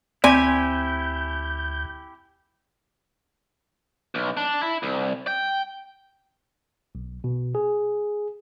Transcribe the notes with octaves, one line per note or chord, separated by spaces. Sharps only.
D2 C4 E4 G4 D5 G#5 G6
B1
D4
E4
C2
G5
B1
B2
G#4